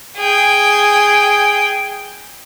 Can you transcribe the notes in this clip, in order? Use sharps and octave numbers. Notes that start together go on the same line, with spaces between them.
G#4 G5